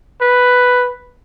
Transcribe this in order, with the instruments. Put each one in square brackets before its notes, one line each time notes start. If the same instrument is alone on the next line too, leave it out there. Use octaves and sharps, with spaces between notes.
[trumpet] B4